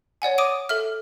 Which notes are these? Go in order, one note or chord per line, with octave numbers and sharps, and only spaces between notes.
C#5 D5 F#5 G#5
D6 D#6 D7 D#7
A4 E5 F6